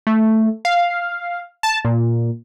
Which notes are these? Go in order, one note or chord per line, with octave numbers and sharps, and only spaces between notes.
A3
F5
A5
A#2